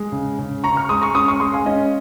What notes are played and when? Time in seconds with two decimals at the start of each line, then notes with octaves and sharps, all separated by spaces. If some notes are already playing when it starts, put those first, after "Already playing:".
Already playing: G#3
0.12 C#3
0.39 C#3
0.63 C#3 A#5 C#6
0.76 C#6 F6
0.89 G#3 C6 D#6
1.02 A#5 C#6
1.15 C#4 C6 D#6
1.28 C#6 F6
1.40 G#3 C6 D#6
1.53 F5 G#5
1.66 C#4 D#5